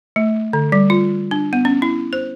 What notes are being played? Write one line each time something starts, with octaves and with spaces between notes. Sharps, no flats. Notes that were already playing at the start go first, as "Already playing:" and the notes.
A3
D3
G3
F4
D4
B3
C#4
E4
C5